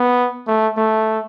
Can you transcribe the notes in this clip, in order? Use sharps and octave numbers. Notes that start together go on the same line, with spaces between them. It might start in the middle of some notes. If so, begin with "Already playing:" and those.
Already playing: B3
A3
A3